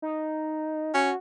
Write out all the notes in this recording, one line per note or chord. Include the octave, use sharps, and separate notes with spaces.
D#4
C#4 F#4